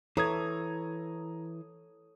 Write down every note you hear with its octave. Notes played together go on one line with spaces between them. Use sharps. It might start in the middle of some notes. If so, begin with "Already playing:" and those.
E3 A4 C#5 A#5 D#6 G#6